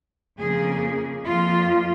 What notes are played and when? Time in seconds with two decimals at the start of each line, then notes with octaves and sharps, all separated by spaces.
0.39 F2 C#3 A#3 G#4
1.25 F2 F3 A#3 F4